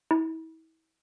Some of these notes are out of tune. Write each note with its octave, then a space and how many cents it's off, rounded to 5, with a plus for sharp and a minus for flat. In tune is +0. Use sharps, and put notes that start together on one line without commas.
E4 -35